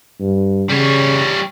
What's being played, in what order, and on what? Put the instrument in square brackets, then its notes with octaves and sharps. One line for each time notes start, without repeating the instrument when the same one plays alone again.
[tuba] G2
[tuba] C#3 [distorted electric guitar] G3 C#5